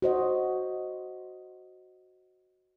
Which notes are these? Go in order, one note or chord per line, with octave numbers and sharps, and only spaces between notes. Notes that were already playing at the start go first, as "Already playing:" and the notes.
F#4 C5 D#5